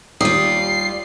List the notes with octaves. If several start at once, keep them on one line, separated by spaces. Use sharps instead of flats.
D#2 G3 F4 D#6 C7